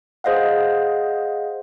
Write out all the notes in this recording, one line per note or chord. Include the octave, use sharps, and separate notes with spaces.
G#4 C5 D#5 F5 F#5